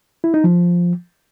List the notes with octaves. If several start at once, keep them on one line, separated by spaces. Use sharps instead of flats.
E4
D#4
F3